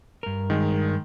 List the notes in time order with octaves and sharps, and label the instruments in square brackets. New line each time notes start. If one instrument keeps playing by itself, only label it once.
[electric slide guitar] G2 A#4
[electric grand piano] D#3 G#3